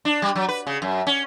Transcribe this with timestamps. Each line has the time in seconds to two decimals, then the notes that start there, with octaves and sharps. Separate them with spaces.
0.05 D4
0.22 G3
0.36 F#3
0.49 B4
0.67 C#3
0.82 F#2
1.07 C#4